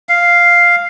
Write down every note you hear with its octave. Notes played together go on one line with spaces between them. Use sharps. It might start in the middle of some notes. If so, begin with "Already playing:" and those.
F5